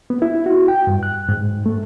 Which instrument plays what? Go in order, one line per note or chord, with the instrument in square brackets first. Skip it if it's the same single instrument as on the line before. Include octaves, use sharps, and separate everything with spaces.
[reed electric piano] B3
E4
F#4
G5
G2
F#6
G#2
A3